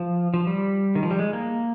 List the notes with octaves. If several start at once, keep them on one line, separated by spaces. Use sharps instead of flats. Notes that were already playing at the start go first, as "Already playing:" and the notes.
Already playing: F3
F3
G3
D#3
F3
G3
G#3
A#3